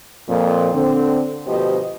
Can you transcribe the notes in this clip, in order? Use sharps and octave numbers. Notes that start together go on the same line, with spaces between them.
F2 A#2
D3 C4
D2 B2 F3 G4 C5 D#5